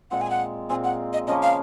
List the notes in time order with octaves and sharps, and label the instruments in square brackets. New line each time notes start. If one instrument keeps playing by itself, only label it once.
[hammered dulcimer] A#2 G#3 C4 [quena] F#5
[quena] G#5
F#5
[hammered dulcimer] A#2 G#3 C4 [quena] G#5
[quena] F#5
D#5
[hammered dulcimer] C#3 F3 A#3 C#4 [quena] D#5
[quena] F5